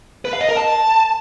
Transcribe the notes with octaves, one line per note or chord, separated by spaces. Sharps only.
B4
F5
D#5
A#4
A5